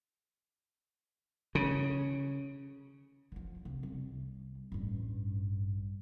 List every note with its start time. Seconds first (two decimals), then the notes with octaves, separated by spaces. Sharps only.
1.55 C#3
3.32 D3 F3
3.65 C3
3.83 C2
4.72 A1 G2